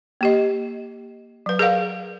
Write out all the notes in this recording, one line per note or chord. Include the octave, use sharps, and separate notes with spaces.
A#3 G4 D#5
F#3 B4
G#4 A#4 D5 F5 F#5